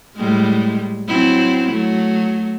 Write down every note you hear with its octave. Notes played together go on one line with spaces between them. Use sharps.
A2 G3 G#3
F#3 C4 E4
F#3 A3